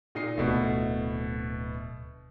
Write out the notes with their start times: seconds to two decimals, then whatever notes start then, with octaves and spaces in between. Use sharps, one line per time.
0.15 A#2 D#4 C7
0.38 D1 B2 A3 B3